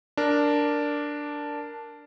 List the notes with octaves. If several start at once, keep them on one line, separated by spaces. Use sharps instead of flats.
D4 A#4